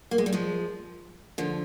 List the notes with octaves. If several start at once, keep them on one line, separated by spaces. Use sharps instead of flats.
A#3
G#3
G3
F3 G#3
D3 F3